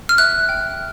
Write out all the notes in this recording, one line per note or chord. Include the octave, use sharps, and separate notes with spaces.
F6
E5 F#6
G5